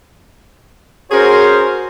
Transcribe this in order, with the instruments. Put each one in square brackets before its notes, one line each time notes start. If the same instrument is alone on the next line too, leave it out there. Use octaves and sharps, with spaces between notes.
[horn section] C#4 F#4 G#4 A#4 C5